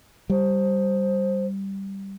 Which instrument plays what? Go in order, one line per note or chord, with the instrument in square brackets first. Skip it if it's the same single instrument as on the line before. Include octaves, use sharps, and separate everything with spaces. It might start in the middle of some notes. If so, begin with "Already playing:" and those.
[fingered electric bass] G3 [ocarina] C5